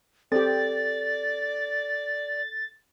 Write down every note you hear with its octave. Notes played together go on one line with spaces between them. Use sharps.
C4 G4 A4 D5 A6